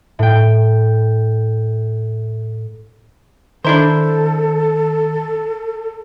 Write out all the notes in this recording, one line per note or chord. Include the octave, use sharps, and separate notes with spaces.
A2 G5
D#3 D4 E4 A4 C5 A#5